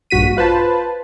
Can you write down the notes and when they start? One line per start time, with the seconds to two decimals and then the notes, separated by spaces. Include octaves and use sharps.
0.10 A#1 G2 F#4 B6 D#7
0.37 F4 B4 C5 A5